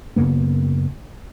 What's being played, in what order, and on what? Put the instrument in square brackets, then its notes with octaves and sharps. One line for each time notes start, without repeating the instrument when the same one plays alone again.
[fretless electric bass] F#2 C#3 A#3 B3